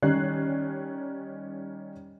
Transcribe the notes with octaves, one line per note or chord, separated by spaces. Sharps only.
D#3 G3 C#4 F#6 G#6 C7